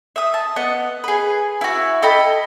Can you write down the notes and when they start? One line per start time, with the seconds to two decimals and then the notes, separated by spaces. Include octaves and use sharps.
0.16 E5 D#6
0.34 A5
0.56 B3 D#5 F#5
1.04 G#4 B4
1.61 E4 F#4
2.02 A4 D#5 G5 B5